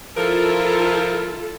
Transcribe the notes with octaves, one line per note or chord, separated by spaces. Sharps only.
F3 E4 F4 A4 A#4